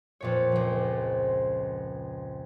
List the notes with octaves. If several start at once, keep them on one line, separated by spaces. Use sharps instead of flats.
F2 A#2 C#5
C#2 F3